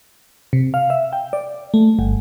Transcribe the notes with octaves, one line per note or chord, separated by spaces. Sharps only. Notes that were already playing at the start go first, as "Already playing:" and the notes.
C3
F5
E5
G5
D5
A3
G1